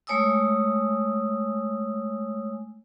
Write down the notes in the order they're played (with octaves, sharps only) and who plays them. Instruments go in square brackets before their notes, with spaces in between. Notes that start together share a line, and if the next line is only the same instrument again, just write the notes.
[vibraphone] G#3 A3 C#5 G#5 D#6 E6